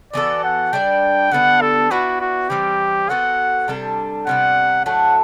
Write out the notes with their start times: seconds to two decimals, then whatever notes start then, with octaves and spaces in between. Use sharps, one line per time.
0.13 E3 B3 F#4 A4 D5
0.44 F#5
0.73 G3 D4 A4 D5 G5
1.31 D3 G3 B3 D4 F#5
1.61 A4
1.91 B3 E4 F#4 B4 D5
2.21 F#4
2.49 E3 G3 C4 G4
3.09 B3 F#4 A4 C5 F#5
3.68 C3 G3 D4 A4
4.27 C3 G3 B3 F#5
4.86 A2 F#3 A3 D4 F#5